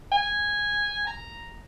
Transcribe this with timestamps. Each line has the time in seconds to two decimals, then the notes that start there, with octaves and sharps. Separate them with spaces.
0.12 G#5
1.07 A#5